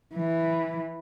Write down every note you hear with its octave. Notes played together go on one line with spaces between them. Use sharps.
E3